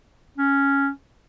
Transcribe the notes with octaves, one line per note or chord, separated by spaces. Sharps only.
C#4